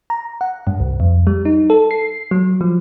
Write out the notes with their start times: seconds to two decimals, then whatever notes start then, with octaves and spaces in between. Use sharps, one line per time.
0.10 A#5
0.41 F#5
0.67 G2
0.80 C2
1.00 F2
1.27 G3
1.45 D#4
1.70 A4
1.91 C7
2.31 F#3
2.61 F3